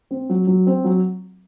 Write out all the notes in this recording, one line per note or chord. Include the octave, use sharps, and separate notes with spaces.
C4
F#3
F#3
C4
F#3